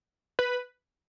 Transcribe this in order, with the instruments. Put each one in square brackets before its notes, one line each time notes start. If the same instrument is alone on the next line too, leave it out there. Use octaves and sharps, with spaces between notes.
[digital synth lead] B4